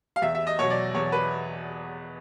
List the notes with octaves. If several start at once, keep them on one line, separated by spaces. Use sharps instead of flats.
F5
E2 E5
E5
D#5
B2 F#3 C#5
D5
E2 C#5
B4